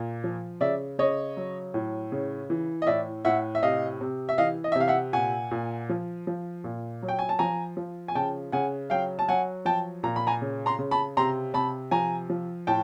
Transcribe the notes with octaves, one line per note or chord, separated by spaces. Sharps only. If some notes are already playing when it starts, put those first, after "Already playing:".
Already playing: A#2
F3
C#3 D5 E5
C#3 C#5 D#5
F#3
A2
C#3
E3
D#5
A2 D5 E5
A2 E5 F#5
E5
C3 D#5 F5
C3
E5
E3 D#5 F5
D#5
E5
C3
F5
E5 F#5
A#2 F#5 G#5
A#2
F3
F3
A#2
F#3
G5
G#5
A5
F3 G#5 A#5
F3
G#5
C#3 G5 A5
C#3 F#5 G#5
F#3 F5 G5
A5
F#3 F#5 G#5
F3 G5 A5
A#2 A#5
B5
G#5 A#5
C#3
A#5 C6
C#3
A5 B5
C3 A#5 C6
C3 A5 B5
F3 G#5 A#5
F3
A2 G5 A5